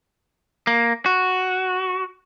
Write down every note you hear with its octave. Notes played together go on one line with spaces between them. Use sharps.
A#3
F#4